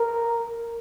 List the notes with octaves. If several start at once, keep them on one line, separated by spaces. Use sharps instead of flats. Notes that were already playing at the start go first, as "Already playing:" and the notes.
Already playing: A#4